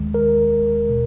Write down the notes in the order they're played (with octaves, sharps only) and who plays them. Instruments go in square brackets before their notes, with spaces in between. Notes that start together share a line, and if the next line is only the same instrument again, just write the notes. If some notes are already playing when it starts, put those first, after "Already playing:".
Already playing: [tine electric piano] D#2 D#3 G#3
A#4
B2